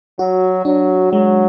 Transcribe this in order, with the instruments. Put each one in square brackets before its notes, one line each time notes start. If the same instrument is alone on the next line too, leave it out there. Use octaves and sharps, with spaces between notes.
[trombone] F#3 [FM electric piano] F#4
[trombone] F#3 [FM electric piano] D4
[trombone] F#3 [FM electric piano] G#3